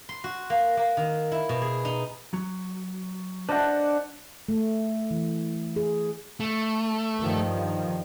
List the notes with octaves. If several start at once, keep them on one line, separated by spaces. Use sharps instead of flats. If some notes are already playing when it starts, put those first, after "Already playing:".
C6
F#4
A#3
A#3
D#3
E4
B2
G#4
D#4
F#3
D4 B4 C5 D#5 F#5
A3
E3
G#4
A3
G2 D#3 F3